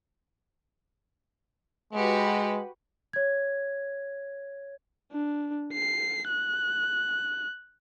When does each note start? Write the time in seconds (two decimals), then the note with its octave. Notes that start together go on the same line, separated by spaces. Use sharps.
1.93 G#3 F#4 G4 B4
3.13 C#5 G#6
5.12 D4
5.74 C7
6.28 F#6